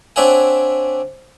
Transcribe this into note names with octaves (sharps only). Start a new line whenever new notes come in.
C4 D4 C#5 E5 F#5 G#5